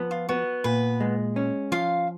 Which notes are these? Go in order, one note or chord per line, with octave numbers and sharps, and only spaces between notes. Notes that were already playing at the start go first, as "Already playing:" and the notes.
Already playing: F3 B3
F4
B3 F#4
A#2 B4
G#3
C#4
F3 F4 F5